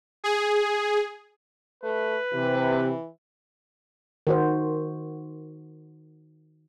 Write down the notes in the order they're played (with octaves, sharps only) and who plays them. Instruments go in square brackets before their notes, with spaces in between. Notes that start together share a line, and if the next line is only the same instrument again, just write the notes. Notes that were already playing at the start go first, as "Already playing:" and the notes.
[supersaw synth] G#4
[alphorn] A3 [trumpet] B4
[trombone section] C3 [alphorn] E3
[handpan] D#3 F#4 C5